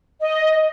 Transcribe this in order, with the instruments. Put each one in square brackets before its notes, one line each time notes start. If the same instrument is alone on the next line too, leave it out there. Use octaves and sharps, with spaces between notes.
[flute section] D#5